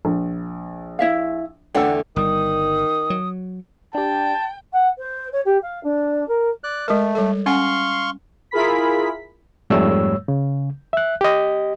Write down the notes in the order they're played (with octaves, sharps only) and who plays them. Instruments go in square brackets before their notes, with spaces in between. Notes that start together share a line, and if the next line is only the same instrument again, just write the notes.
[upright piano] A#1
[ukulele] E4 E5 F5
[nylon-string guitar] E2 D3 A3 [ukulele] D4 D5 F#5 [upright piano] G5 E6
[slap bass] G1 G3 [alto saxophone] D#3 [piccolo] D#6
[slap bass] F#3
[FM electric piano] D4 G4 [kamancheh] G5 [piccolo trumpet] A5
[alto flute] F#5
C5
C#5
G4
F5
D4
A#4
[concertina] D5 F#6
[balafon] G#3 A#4 [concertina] A3
[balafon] G3 A4
[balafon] C#4 F#5 G#5 [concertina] F5 C6 C#6
[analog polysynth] E4 F4 G#4 A#4 B5 B6
[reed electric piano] F2 G#2 G3 A3 C#5 E6
C#3
E5 F#6
G4 D#5